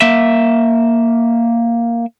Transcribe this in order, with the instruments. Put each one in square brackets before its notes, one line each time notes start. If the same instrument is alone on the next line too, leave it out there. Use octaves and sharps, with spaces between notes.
[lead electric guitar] A#3 E5